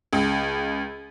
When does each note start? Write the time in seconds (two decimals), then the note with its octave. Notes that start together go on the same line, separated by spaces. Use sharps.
0.13 C#2